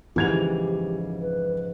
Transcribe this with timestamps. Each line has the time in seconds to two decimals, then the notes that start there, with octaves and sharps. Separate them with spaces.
0.16 F2 G#2 C#3 E3 G4 G#6 F7
1.21 B4